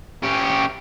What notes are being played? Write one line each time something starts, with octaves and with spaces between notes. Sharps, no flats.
C#4 G4